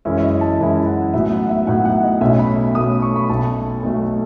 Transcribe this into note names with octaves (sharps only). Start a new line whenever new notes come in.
F#2 E3 G#3 C#4 E4 E5
E5
D#5
A5
F#2 E3 G#3 C#4 E4
F#5
A2 F#3 B3 D#4 E5
F#5
E5
A2 F#3 B3 D#4 F#5
F#5
D#5
B1 B2 A3 C#4 E5
B5
B1 B2 A3 C#4 D#6
C#6
B5
B1 B2 A3 A5
B1 B2 A3